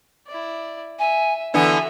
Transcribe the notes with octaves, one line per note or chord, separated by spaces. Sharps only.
E4 D5
E5 G#5
D3 E3 B3 F#4 E5 G#5